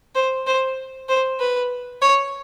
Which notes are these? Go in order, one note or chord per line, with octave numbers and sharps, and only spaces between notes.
C5
C5
C5
B4
C#5